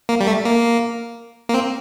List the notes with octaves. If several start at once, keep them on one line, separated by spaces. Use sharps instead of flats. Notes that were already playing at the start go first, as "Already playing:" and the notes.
A#3
G3
A3
A#3
A#3
C4